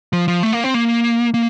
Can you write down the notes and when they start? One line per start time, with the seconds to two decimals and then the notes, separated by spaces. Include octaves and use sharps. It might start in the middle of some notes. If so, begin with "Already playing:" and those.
0.13 F3
0.28 F3
0.43 A3
0.53 A#3
0.64 C4
0.74 A#3
1.34 A#3